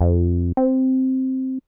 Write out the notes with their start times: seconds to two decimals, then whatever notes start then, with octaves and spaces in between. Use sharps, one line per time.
0.01 F2
0.57 C4